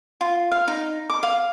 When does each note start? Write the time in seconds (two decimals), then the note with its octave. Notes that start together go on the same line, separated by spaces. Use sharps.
0.21 F4
0.51 F5
0.68 D#4
1.10 D6
1.23 F5